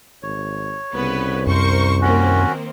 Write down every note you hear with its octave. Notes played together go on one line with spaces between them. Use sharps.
G#1 C#5
C2 C#3 B3 B4
F#2 A#4 C5 C#6
D#3 A#3 C4 C#4 F#4